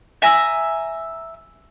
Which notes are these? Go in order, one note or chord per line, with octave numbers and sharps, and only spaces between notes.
E5 G#5 A#5 E6